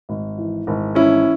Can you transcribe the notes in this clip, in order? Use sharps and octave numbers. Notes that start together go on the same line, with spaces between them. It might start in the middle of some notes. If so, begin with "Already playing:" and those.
G#1
E3
G#1
E3 C#4 E4